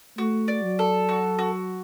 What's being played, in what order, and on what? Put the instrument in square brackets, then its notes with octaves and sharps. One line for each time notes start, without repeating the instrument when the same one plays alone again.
[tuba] A3 [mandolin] F#4
[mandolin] D5
[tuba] F#3
[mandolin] A4
F#4
F#4